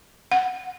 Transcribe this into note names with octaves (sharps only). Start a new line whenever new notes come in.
F#5